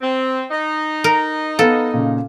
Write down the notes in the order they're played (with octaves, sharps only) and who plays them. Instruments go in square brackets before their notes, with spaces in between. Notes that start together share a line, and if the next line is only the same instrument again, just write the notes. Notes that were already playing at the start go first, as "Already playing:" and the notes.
[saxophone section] C4
D#4
[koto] A#4
[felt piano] B3 F5 [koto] A4
[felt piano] A#2 C#3